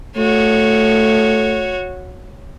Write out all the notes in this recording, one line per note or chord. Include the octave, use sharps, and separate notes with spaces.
A3 F#4 C#5